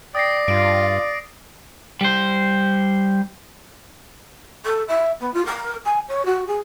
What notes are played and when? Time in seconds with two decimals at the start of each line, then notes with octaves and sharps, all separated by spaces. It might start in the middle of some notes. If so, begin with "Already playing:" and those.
0.15 D5 G5 D#6 A#6 C7
0.48 G2 F4 D7
2.01 G3 C5
4.65 A4
4.88 E5
5.19 B3
5.33 F4
5.45 A#4
5.85 G#5
6.08 C#5
6.25 F#4
6.47 G#4